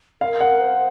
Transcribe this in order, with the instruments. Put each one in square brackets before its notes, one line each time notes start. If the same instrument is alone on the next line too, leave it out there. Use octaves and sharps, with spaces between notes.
[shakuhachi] A#4 [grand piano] F5
[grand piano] F#5
[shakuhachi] C5